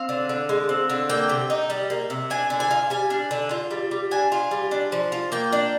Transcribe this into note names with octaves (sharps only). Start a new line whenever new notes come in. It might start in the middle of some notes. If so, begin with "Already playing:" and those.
Already playing: C4 F5
D3
D3
G#3
C4
D3
A#3 G5
C3
D#4
G3
A#3
C3
D4 G#5
D3
G#5
F4
G3 G#5
D4
D3
F4
G3
G3
D4 G#5
F4
G3
D4
F3
F4
A#3 G5
D4